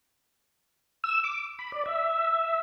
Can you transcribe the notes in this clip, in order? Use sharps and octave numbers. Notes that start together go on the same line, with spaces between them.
E6
D6
B5
D5
E5